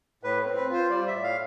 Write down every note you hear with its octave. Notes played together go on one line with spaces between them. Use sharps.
A2 B4
C4
B4
F4
C5
G3 D5
A2 E5
F5